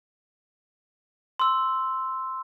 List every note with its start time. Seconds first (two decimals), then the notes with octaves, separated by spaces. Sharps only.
1.39 C6 E6